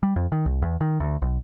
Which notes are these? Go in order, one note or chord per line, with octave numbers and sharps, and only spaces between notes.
G3
F2
D#3
C2
E2
D#3
D2
B1